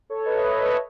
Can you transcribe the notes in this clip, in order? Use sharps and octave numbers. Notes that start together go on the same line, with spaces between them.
A4 C#5
B4 D#5
E5
B4 D#5
A4 C#5
A4 C#5